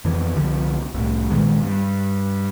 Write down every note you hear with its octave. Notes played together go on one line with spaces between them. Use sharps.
F2 E3
C2 D3 E3 F3
C2 A2
B1 A#2 D#3 G#3
G2